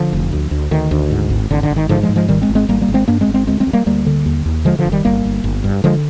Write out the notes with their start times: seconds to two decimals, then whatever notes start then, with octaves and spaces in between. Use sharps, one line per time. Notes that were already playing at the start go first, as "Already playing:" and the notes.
Already playing: D3 F3
0.13 F1
0.33 D2
0.51 D2
0.71 D2 D#3
0.91 D2
1.11 G#2
1.30 G#1
1.50 G#1 D3
1.63 D3
1.70 G#1
1.76 D#3
1.89 G#2 D3 F3
2.03 F3 G#3
2.09 G#2
2.16 F3 G#3
2.29 G#1 D#3 G3
2.42 G#3 C4
2.49 G#1
2.55 G#3 C4
2.69 G#1 G3 A#3
2.81 G3 A#3
2.88 G#1
2.94 G#3 C4
3.08 G2 A#3 D4
3.21 G#3 C4
3.27 G#1
3.34 G#3 C4
3.47 D2 G#3 C4
3.60 G#3 C4
3.67 D2
3.73 G3 A#3
3.86 D2 G3 A#3
4.07 D3
4.26 D#2
4.46 D#2
4.65 D3 F3 G#3
4.79 D3 F3
4.85 F1
4.92 D#3 G3
5.05 G1 G3 A#3
5.25 G1
5.44 G1
5.64 G2
5.84 D3 F3 G#3